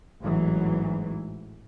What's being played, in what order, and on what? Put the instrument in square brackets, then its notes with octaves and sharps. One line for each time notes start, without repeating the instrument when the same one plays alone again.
[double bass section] A1 G#2 E3 F#3